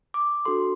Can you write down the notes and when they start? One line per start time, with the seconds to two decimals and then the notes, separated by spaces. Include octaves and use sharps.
0.14 D6
0.45 D4 F#4 A4 C6